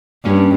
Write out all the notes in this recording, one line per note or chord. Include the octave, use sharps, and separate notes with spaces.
G2 A#3 C#4